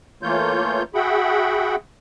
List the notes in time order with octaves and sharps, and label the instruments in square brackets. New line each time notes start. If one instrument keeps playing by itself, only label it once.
[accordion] E3 A3 A#3 F4 C#5 G6
F#4 G#4 E5 F#5 G5 B5